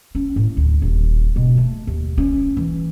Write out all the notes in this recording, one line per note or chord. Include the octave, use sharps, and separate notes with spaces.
C#4
A2
D2
D#1
B2
A3
D#2
C#4
E3